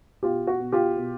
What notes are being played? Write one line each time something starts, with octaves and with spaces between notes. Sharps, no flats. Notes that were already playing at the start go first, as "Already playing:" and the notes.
B2 F4 G4
F#4
B2
F4 G4
B2